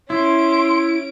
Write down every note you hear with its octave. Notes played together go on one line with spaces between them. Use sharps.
C#4 E4 C6 D7